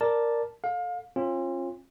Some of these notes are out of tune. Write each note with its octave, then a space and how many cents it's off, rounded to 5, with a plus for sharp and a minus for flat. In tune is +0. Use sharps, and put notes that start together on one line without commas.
A#4 +0 D5 +0 A5 +0
A4 +5 F5 +30
C#4 -45 F4 +0